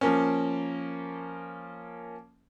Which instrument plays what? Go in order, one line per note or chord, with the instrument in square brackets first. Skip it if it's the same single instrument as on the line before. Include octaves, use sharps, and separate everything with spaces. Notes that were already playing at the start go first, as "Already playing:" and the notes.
[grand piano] F3 A#3 C#4